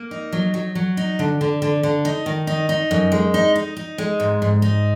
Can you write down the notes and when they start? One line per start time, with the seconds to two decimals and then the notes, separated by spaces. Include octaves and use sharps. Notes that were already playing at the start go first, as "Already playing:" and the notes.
Already playing: A#3
0.11 D#4
0.32 F#3
0.54 F#3
0.75 F#3
0.97 D#4
1.19 D3
1.41 D3
1.62 D3
1.83 D3
2.05 D#4
2.26 D#3
2.47 D#4
2.69 D#4
2.91 F#2
3.12 G#3
3.34 D#4
3.56 D#4
3.77 D#4
3.98 G#3
4.20 G#2
4.42 G#2
4.62 D#4